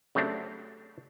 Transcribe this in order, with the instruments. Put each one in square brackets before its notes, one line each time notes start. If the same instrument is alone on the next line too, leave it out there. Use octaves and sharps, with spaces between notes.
[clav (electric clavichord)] C#3 F#3 A3 C4 D4 G4